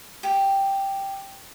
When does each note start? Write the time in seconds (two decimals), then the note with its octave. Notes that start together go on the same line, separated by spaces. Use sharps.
0.23 G4